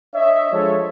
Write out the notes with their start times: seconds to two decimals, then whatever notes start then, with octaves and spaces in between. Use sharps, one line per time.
0.15 D4 C#5 D#5 E5
0.52 F3 G#3 A4 C#5